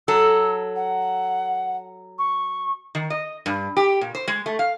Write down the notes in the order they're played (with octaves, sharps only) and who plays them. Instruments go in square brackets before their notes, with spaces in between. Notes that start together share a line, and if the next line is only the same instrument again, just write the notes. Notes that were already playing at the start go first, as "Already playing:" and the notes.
[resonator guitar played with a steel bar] F#3 A4 [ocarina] E6
[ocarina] F#5
C#6
[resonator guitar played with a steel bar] D#3
D#5
G2
G4
A#2
C5
G#3
A3
F5